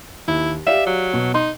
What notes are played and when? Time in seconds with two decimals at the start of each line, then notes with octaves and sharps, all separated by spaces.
0.28 D#2 E4
0.67 G4 D5 E5 F5
0.87 F#3
1.13 B2
1.34 D#4 C6